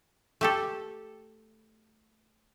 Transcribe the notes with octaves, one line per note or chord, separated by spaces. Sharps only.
A3 G4 A4